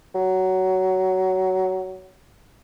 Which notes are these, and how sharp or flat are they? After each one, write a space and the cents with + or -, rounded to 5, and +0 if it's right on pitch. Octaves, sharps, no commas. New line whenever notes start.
F#3 +15